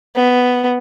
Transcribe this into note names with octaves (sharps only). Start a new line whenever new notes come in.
B3